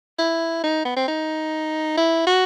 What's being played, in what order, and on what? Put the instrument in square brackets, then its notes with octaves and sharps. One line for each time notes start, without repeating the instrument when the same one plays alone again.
[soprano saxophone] E4
D#4
B3
C4
D#4
E4
F#4